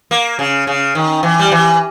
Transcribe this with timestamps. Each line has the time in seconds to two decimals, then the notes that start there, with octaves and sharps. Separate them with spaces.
0.11 A#3
0.39 C#3
0.67 C#3
0.95 D#3
1.23 E3
1.39 G3
1.52 E3